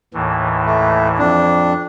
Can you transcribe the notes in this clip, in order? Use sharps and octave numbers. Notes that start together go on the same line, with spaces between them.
D#2 A2 E3
A3
F2 D4